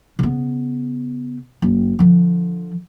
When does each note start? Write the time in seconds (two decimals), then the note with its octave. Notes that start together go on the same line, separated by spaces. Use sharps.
0.19 C#3 B3
1.62 F#1
1.99 D3 F3